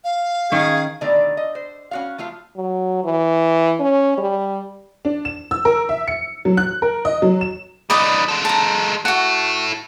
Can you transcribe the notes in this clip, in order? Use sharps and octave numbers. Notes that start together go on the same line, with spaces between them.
F5
D#3 C#4 G#4
B2 D3 D#3 A3 D5
D#5
C5
C#4 F#4 F5
F3 A3 F4 F5
F#3
E3
C#4
G3
D4
E7
E6
A#4
E5
C#7
F#3
F#6
A#4
D#5
F#3
E7
G3 D#4 B4 D5 D#5
G#3 A4
A5 A#5
E4 F#4 A4 F#5